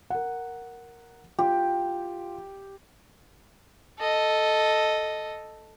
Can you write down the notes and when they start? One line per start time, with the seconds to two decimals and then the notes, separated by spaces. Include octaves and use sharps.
0.10 A#4 F#5
1.38 F4 G4
3.99 A4 D#5